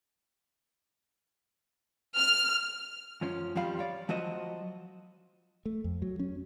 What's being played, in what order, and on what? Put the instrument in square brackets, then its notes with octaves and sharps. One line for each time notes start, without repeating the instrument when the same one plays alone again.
[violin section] F6
[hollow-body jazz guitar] F#2 F3 C#4
F2 F3 G3 F5 B5
C#5 D5
F3 F#3 F#4 C5 D#5
[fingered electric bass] A3
F2
F#3
C#4